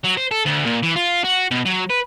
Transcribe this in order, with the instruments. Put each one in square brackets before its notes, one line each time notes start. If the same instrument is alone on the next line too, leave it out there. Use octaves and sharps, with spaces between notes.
[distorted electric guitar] F#3
C5
A4
D2
A#2
E3
F4
F#4
B2
F#3
B4